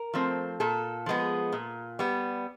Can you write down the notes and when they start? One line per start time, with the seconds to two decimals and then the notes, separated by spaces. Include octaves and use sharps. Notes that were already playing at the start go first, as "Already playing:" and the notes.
Already playing: A#4
0.14 F3 A3 C4
0.60 A#2 A4
1.06 F3 G#3 B3
1.52 A#2
1.99 G3 B3